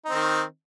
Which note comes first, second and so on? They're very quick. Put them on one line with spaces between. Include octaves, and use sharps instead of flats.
D#4 C4 D#3